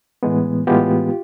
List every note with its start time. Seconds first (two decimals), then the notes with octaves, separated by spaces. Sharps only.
0.23 A2 E3 G#3 B3
0.67 A2 E3 G#3 B3 F4 G4